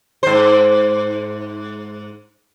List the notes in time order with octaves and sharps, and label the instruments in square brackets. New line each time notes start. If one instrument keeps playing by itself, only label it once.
[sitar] G#2 C5